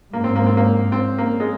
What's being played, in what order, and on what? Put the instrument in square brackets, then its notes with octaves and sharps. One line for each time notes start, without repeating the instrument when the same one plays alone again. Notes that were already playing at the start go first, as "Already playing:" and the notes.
[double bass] G#2 [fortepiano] A#3
[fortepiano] C4
A#3
C4
A#3
C4
A#3
G#3